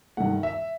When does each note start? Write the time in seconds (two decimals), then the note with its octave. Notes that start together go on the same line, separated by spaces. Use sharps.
0.17 G2 D#3 A3 F#5
0.43 E5